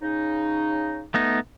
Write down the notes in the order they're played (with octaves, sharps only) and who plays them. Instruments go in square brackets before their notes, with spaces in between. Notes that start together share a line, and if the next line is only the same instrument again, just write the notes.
[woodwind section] C#3 D#4
[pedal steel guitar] A3 B3 D#4